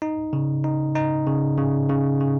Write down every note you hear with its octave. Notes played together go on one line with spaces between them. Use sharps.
D#4
C#3
D#4
D#4
C#3
C#3
C#3
C#3